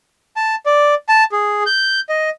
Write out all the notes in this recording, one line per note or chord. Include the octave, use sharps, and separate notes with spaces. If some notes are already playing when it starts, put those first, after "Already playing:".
A5
D5
A5
G#4
G6
D#5